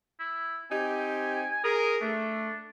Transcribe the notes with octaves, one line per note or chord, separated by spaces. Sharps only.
E4
C4 D#4 G4 G#5
G#4 A#4 D#6
A3 D4